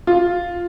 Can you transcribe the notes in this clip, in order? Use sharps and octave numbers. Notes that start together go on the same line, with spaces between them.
F4